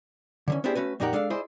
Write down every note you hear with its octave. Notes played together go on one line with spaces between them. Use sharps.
D3 E3 C#4
B3 C4 D4 E4 G4 G#4
A3 C#4 F#4 B4
F2 A#2 D#4 G4 A#4 F#5
G#3 D4 A4 D5 F5
E4 G#4 C5 D5 D#5